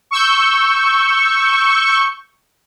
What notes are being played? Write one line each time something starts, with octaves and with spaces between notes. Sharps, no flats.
C#6 E6 G6